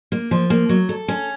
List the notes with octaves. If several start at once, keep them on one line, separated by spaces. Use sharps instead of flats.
A#3
F3
A#3
F#3
A4
C#4